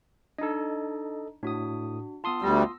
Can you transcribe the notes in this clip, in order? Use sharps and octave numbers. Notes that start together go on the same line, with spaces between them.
D4 D#4 A4 D#5
A2 D4 F#4 D#6
B3 F4 A5 C6 D#6
D2 G3 E6 A#6